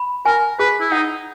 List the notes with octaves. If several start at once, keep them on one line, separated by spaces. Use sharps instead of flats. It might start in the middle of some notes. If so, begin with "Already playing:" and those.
Already playing: B5
A#4 G#5
G#4 B4
E4
D#4 F#5